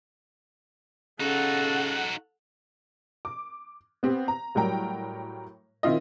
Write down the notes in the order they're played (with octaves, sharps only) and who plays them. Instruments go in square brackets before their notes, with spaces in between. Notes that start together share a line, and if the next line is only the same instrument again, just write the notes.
[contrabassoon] C#3 [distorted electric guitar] D#4 F#4 [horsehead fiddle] A4 F#5
[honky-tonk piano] D6
B3 C4 G4
A#5
A2 F#3 G3 A#4 G5 A#5
D#3 C4 E4 F4 D#5